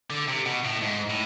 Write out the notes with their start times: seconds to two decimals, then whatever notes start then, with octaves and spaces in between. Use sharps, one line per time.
0.10 D3
0.28 C3
0.46 B2
0.65 A2
0.82 G#2
1.10 A2